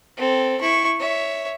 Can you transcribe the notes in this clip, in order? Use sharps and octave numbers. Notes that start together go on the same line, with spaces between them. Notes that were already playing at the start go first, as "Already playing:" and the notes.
C4 A4
E4 C#6
C#5 E5